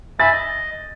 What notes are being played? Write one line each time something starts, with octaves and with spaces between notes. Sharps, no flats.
E5 G#5 B5 A6
D#5